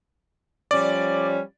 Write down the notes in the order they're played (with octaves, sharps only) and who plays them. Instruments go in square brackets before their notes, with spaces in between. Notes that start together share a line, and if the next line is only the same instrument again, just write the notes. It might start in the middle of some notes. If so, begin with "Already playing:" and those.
[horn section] F3 G3 C#4 [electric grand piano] D5